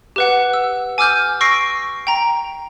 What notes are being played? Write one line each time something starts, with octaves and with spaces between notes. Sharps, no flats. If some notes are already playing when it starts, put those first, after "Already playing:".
G4 B4 F#5
E6
G#5 D6 E6 F6 G6
C#6 E6 A#6 C7 D7
G5 A#5